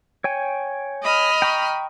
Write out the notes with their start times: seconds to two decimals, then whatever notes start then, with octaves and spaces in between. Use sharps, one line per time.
0.24 C#5 G5 G#5
1.02 D#5 B5 F6
1.42 G5 A#5 C#6